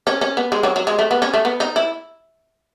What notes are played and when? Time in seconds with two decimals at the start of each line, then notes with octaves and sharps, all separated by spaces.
0.07 C#4
0.21 C#4
0.37 B3
0.52 G#3
0.63 F#3
0.76 F#3
0.87 G#3
0.99 A3
1.11 B3
1.22 C#4
1.34 A3
1.45 B3
1.60 D#4
1.76 E4